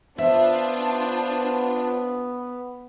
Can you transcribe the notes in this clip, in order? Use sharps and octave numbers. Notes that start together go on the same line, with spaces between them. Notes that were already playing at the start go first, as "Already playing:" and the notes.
B3 D4 F4 C5 E5